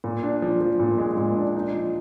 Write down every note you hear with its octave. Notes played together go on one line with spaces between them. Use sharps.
A#2
D4
F3
F3
A#2
G#3
A#2
D4
D#4
F3